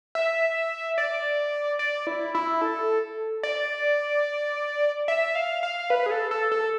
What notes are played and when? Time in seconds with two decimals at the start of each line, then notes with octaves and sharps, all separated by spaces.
0.15 E5
0.98 D5
1.79 D5
2.07 E4
2.35 E4
2.61 A4
3.43 D5
5.08 E5
5.35 F5
5.63 F5
5.90 B4
6.06 G#4
6.11 A4
6.31 A4
6.52 A4